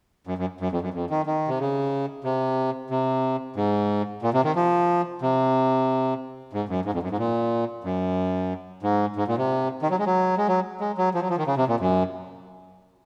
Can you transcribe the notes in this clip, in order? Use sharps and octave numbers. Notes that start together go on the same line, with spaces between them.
F#2
F#2
F#2
F2
F#2
F2
D#3
D#3
C3
C#3
C3
C3
G#2
A#2
C3
D#3
F3
C3
G#2
F#2
G#2
F2
F#2
G#2
A#2
F#2
G#2
G#2
A#2
C3
D#3
F#3
G#3
F#3
G#3
F#3
G#3
F#3
F3
F#3
F3
D#3
C#3
C3
A#2
F#2